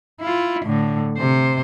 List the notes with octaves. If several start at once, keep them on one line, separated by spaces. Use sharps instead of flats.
E4 F4
A2 D3
C3 C5